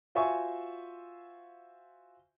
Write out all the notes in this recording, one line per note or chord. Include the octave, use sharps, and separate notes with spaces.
F4 F#4 C5 E5 G#5 C#6